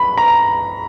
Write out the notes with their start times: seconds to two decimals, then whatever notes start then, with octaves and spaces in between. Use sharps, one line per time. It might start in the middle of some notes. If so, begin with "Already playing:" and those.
Already playing: B5
0.18 A#5